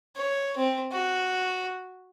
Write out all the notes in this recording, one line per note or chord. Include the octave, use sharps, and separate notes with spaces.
C#5
C4
F#4